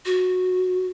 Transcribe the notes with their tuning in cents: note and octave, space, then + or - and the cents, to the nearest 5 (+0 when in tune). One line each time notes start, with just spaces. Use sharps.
F#4 -15